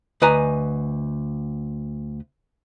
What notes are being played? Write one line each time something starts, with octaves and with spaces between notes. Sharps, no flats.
D2 B4 D#5 G#5 A#5